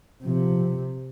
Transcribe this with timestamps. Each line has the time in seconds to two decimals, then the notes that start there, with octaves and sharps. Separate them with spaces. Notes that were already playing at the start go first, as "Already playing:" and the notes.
0.24 C3 F3